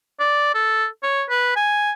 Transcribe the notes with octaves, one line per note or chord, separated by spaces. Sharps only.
D5
A4
C#5
B4
G#5